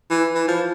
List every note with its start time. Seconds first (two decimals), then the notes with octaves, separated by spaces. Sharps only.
0.11 E3
0.35 E3
0.48 F3